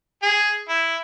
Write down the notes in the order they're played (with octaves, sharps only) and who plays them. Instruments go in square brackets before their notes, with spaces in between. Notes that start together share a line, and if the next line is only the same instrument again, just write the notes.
[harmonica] G#4
E4